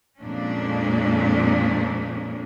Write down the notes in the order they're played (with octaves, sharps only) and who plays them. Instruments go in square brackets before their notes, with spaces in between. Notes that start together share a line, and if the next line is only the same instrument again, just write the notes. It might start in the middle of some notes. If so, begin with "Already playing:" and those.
[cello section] F2 A#2 G#3 A#3 C#4 D4